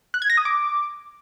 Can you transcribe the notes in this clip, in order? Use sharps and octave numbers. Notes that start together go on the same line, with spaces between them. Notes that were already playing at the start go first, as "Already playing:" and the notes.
F#6
G#6
A#6
D#6
D6